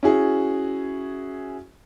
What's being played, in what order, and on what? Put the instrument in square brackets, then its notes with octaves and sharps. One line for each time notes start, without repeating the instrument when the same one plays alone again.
[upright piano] C#4 E4 F#4 G#4